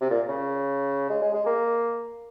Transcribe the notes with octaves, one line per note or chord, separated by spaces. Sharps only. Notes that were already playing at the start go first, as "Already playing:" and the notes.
C3
A#2
C#3
G#3
G#3
G#3
A#3